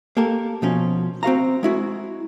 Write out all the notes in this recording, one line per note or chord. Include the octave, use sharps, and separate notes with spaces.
A#3 G4 A4 A#4
B2 F3 C#4
C4 F#4 F5 A#5
G#3 E4 F#4